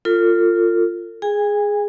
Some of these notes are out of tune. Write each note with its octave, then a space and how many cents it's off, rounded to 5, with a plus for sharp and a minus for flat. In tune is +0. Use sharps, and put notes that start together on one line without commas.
F4 +0 A4 +45
G#4 +0 G#5 -40